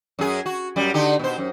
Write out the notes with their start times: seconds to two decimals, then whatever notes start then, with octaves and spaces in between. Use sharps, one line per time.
0.19 F#2 G#4
0.46 F#4
0.76 F#2 G3
0.94 D3 D#4 G4
1.19 B2 C5
1.38 F#2